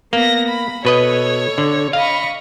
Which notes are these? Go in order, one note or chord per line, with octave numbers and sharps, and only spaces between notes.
A#3 B3 A#6
B5
B2 A4 B4 C#5 D#5
D3
D#5 F5 B5 C#6